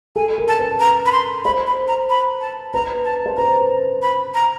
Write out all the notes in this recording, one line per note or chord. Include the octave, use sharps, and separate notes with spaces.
A4 G#5
A#4
A5
B4
A#5
B5
C6
C5 B5
B5
A#5
B5
A5
B4 A#5
A5
C5
B4 A#5
B5
A#5